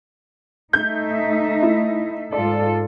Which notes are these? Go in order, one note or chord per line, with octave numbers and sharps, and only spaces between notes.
A3 D#4 E5 G6
E4
G#2 F4 A4 D5